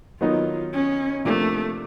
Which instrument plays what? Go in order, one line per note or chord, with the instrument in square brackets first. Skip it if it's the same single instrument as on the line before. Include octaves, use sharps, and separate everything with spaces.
[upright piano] D#3 F#3 B3 D#4 [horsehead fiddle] F4
[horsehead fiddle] C#4
[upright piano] C3 F3 A#3 D4 [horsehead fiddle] A3